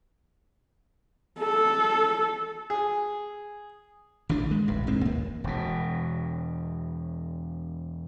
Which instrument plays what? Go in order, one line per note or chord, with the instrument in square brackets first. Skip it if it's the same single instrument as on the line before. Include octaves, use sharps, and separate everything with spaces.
[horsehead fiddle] A4
[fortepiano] G#4
[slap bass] A1 D#3 E3 D4
G#3
D1 A1 G2
F1 G#2 G#3 C4
D#2 A#3
E1 B2